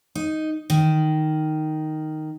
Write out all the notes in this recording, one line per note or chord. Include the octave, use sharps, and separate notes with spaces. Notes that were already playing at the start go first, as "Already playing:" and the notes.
D#4
D#3